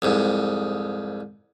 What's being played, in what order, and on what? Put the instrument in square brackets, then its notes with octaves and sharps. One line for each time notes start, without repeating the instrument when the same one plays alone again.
[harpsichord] C2 F2 G#2